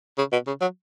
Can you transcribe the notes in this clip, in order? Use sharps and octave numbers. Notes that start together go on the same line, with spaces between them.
C#3
B2
C#3
F#3